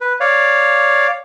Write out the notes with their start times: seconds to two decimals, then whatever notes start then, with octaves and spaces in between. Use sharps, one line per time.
0.01 B4
0.20 C#5 D5 F5